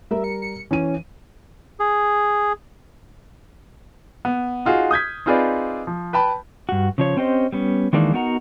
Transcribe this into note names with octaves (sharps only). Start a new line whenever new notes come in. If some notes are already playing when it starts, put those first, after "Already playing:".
G3 A#4 E5
C#7
C#7
E3 C#4 D#7
G#4
B3
D#4 F4 F#4 G#4
D#6 G6 G#6 B6
C4 D#4 F4 G#4 B4 D5
F3
B4 G5 A5 B5
G2 F#4
C#3 F3 C#5
C4 C#4 G4 C5 D#5
G3 B3 C#4
D#3 E3 G#3 A#3 D4 D#4
B3 D#4 F#4 A#4 F#5 A#5